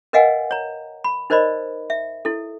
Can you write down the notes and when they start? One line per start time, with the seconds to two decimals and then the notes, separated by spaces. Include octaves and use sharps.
0.13 A#4 B4 D#5 F5 F#5 G#5
0.51 C#5 A#5
1.04 B5
1.30 D#4 A#4 C5 D5 D#5 B5
1.90 E5
2.25 E4 A4